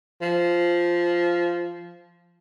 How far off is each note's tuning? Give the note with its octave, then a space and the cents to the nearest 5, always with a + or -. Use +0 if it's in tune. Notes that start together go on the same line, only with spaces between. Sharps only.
F3 -10